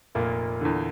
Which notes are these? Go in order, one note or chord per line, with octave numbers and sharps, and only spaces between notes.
F1 A#2 A#3
E2 D3